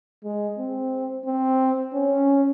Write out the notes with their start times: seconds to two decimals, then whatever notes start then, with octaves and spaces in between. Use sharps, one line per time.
0.24 G#3
0.59 C4
1.26 C4
1.93 C#4